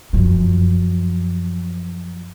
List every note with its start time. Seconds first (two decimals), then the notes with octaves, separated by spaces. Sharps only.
0.13 F#2 F3